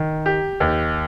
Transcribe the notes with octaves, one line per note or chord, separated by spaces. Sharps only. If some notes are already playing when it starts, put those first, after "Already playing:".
Already playing: D#3
G4
D#2